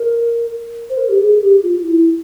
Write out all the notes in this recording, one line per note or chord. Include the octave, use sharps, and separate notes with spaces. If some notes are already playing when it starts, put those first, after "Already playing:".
Already playing: A#4
C5
A#4
G4
G#4
G4
F4
E4